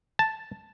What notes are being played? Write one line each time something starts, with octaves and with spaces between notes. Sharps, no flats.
A5